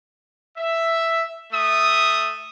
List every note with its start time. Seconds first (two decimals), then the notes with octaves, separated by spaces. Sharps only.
0.57 E5
1.53 A3 E5 D#6